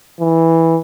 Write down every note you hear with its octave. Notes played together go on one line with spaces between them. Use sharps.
E3